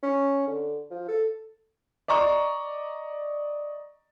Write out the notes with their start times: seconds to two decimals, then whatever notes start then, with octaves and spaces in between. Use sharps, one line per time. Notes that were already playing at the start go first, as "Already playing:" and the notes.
0.03 C#4
0.47 D3
0.91 F3
1.08 A4
2.08 D5 D#5 A#5 C#6